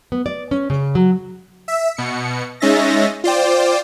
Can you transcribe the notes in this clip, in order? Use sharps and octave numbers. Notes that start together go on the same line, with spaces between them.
B3
D5
C#4
C#3
F#3
E5
B2 C#7
G#3 C#4 D#4 E5 A6 A#6
F4 C5 D5 G5